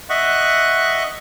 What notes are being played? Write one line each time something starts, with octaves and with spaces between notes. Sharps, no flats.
D#5 E5 F#5 C#6 F#6